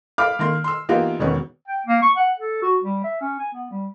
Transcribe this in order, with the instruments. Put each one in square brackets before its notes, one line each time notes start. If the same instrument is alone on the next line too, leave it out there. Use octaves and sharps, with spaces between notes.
[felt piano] F5 B5 D6 F6
D#3 A#3 C6
C6 E6
E3 A#3 B3 D#4 F4 G4
E1 D#3 B3 C#4
[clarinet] G5
A#3
C#6
F#5
A4
F#4
G3
E5
C#4
G#5
B3
G3